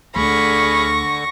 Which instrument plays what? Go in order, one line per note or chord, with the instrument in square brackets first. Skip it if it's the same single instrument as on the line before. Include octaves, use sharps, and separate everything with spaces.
[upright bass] D2 [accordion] D3 [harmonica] G#4 F5 B5 [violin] C#6 A#6